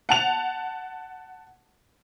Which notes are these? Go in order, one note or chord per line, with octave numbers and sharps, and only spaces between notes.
F#5 A5 F7